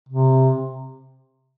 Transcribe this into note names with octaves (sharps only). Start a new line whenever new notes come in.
C3